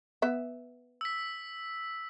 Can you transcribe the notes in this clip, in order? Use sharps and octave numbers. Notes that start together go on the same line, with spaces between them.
B3 E5
E6 B6